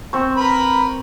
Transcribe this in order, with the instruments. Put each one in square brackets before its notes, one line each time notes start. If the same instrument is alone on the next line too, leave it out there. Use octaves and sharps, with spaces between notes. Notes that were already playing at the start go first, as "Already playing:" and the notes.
[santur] C4 C#6
[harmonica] A#4 B4 B5